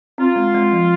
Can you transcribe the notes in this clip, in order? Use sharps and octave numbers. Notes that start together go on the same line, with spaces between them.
C4 F4
G#3
G#3
F3